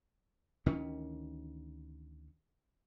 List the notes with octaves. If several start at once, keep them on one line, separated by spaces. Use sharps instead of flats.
D2 D#3 E3 C#4